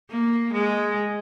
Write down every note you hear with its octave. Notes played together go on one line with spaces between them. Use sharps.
A#3
G#3